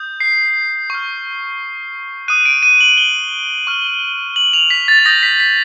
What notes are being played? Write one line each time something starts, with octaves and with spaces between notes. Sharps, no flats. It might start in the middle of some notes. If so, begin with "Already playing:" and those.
Already playing: D#6 G6
C7
C#6 F6
D#6 F#6 D#7
D7
D#7
F#7
G7
C#6 F6
F#7
F7
B6
A6
A6
D#6 G6 A#6
B6
B6